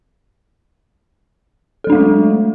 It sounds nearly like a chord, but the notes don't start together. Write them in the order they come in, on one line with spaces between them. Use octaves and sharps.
A4 F#3 D4 A3 G#3